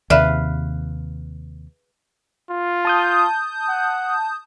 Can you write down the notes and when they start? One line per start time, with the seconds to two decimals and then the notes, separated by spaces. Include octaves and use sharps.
0.10 D#2 C3 B4 D5 E5 F5
2.50 F4
2.85 A5 D#6 G6
3.69 F#5